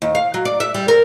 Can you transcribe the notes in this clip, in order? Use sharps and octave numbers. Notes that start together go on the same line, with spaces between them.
D#2
F5
F#3
D5
E5
G3
A#4